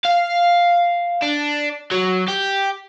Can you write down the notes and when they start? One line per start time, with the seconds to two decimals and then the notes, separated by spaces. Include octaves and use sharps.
0.05 F5
1.23 D4
1.91 F#3
2.28 G4